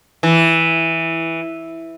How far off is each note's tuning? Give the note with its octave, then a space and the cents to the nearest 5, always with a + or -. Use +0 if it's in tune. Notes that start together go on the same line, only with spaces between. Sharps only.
E3 -5